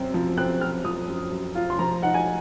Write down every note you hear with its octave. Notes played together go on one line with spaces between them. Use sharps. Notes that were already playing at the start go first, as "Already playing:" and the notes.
Already playing: F#2 C4
F3
C4 F#6
C4 F6
F3 D#6
F#2
F#2
F4
C6
F3 A#5
D#4 F#5
G#5